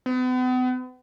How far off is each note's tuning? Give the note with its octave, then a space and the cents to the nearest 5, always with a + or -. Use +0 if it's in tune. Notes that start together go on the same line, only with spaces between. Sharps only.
B3 +40